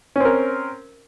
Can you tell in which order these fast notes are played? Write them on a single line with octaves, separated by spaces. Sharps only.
C#4 C4 A#4